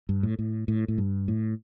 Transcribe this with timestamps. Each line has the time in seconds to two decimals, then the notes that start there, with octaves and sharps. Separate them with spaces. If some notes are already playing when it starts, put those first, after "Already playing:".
0.09 G2
0.23 A2
0.39 A2
0.68 A2
0.88 A2
0.98 G2
1.28 A2